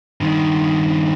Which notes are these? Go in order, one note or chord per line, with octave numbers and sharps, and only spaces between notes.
G2 D#3